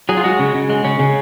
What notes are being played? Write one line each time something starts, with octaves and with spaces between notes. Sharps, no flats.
F#3 G#4
F4
G#3 F#4
C#3
C#3
G#3
C#3 C#4
C#3